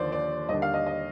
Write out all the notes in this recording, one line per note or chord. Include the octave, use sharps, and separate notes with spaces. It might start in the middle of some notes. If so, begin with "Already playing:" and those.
Already playing: D#2 D3 F3 C5 D5
D5
D#2 D3 G3 D4 D#5
F5
D#5
D#5